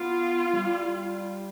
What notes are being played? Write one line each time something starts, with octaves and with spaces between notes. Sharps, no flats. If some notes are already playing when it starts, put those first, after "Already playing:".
Already playing: B3 F4
G3